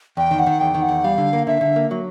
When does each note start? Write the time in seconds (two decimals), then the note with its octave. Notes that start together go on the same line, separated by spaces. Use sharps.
0.17 E2 G5
0.31 D#3
0.39 F#5
0.46 D#3
0.60 E2 G5
0.75 D#3
0.82 F#5
0.89 E2
1.04 G3 F5
1.18 D3
1.33 A#3
1.47 D3 E5
1.61 D3
1.76 A#3
1.91 F#3